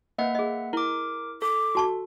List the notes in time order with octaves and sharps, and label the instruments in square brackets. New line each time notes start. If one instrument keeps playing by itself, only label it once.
[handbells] A#3 E5 F#5 [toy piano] B4 D#5
[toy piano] G#4 D#5
[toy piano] E4 [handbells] A#4 D6
[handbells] A4 [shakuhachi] D6
[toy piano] F#4 A5 C#6